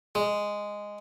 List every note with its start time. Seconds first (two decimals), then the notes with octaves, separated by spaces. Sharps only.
0.15 G#3